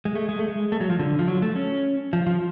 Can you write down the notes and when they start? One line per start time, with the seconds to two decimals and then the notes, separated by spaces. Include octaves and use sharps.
0.05 G#3
0.15 A3
0.29 G#3
0.39 A3
0.48 G#3
0.72 A3
0.81 F#3
0.90 F3
0.99 D3
1.19 F3
1.28 F#3
1.42 A3
1.56 C#4
2.13 F3
2.27 F3